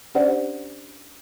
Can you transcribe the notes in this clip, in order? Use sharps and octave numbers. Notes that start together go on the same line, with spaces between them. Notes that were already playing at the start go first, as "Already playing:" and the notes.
C#4 D4 G4 C5 D5 F#5